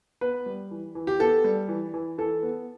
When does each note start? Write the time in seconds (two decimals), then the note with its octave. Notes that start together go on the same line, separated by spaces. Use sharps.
0.21 B3 B4
0.46 G3
0.71 E3
0.95 E3
1.07 G4
1.19 B3 A4
1.44 G3
1.68 E3
1.94 E3
2.18 E3 A4
2.43 B3